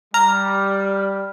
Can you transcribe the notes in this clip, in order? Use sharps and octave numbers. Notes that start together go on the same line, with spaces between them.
G3 A#5 F6